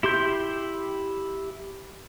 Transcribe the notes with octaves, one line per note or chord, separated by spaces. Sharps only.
E4 G4 C6 G6